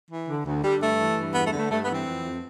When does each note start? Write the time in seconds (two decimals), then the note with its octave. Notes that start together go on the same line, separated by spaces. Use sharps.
0.10 E3
0.28 D3
0.45 D2
0.63 D3 G3
0.81 G2 A3
0.99 E3
1.16 G2
1.35 E2 B3
1.47 A3
1.52 D3
1.58 A3
1.70 G2 A3
1.82 B3
1.88 E3
1.94 C4
2.05 F2
2.23 F2